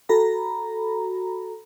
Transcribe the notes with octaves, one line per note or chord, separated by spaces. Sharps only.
F#4 A4 A#5 B5